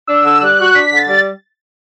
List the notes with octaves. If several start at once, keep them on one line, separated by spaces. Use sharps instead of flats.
D4 E6
D3
G3 F#6
F#4
D4 B6
D3
A6
G3